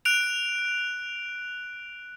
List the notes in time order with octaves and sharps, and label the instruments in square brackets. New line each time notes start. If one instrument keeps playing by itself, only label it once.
[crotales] F#6 D7 F7